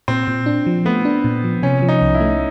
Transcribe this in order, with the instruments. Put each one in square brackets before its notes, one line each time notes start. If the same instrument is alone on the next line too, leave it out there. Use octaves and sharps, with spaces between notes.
[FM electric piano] A#2 [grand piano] C4
[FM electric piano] A#2
D4
F3
[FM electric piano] A3 [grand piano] B3
[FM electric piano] D4
A#2
F3
[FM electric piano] C3 [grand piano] C#4
[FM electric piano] F3
[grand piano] D#4
[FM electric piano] C2
[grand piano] E4
[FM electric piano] A3